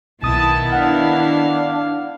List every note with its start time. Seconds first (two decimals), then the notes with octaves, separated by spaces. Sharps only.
0.23 B1 D#3 B3 E4 A5 D#6
0.72 D4 F5 F#5